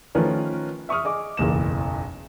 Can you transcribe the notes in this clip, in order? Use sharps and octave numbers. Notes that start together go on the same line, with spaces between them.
D#3 F3 A3 C#4 A#4 B4
E5 C#6 D#6 F6
G#4 D#5 D6
F#1 B1 E2 E7